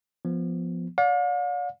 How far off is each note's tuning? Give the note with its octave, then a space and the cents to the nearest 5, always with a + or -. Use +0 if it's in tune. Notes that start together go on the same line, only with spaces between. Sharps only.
F3 +0 B3 -5
D5 -30 F5 +45